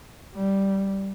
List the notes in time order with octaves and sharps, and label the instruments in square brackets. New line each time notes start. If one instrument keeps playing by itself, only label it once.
[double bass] G3